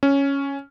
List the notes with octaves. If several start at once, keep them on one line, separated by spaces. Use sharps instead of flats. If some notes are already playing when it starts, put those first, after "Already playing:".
C#4